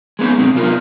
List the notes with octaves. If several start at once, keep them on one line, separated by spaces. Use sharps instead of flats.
G#3 B3 C#4 D#4
F#2 B2 C4 D#4
C3 F#3 B3 F4 A#4